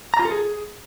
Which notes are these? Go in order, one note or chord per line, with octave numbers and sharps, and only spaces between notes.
A#5
F4
A4
G#4